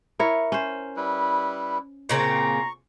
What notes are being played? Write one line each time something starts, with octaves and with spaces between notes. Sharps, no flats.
E4 A#4 C#5
C#4 C5
G3 E4 B4
A#2 C#3 C4 A#5 C#6